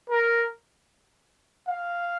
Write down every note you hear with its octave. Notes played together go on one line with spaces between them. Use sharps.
A#4
F5